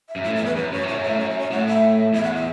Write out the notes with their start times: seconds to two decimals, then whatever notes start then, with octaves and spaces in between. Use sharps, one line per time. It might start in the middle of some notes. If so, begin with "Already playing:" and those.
0.09 E5
0.16 F#2
0.24 A2 E5
0.35 E2 E5
0.45 B4
0.56 F#2 B4
0.72 F#2 C#5
0.83 A2 C#5
0.95 F#2
1.03 A2 E5
1.18 F#2 C#5
1.29 E5
1.40 C#5
1.51 A2 F#5
1.67 E5
2.13 E2 E5
2.24 F#5
2.35 E5